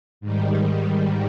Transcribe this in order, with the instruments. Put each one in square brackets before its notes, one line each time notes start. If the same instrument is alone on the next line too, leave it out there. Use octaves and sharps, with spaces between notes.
[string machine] G#2 D#3 G3